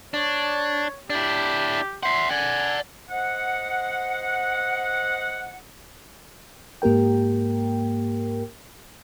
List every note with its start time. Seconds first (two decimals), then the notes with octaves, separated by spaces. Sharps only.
0.14 D4 C#5
1.10 D4 E4 G4
2.03 E5 F#5 C6
2.31 D5 F#5 G#5
3.09 C5 D#5 F#5
6.82 G#2 A#3 G4 A#4 G5